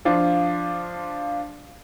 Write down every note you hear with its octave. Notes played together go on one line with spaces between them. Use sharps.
F3 D4 F4